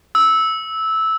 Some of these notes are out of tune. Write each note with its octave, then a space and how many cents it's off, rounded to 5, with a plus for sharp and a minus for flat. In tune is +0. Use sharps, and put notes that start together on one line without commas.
E6 -10